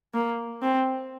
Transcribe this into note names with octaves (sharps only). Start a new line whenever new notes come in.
A#3
C4